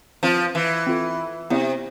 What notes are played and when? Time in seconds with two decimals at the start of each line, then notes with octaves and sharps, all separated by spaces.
0.23 F3 C4 F4 B4 F5 A5
0.55 E3
0.87 C4 F4 A4
1.50 C3 B3 E4 G4 D5